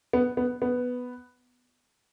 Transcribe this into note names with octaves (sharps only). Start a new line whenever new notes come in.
B3
B3
B3